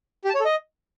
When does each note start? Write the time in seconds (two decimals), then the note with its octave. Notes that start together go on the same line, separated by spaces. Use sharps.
0.24 G4
0.30 A5
0.35 C#5
0.40 A4
0.45 D#5